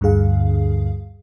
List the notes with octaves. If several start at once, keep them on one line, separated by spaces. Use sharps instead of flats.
D2 G2 D3 G#4 F5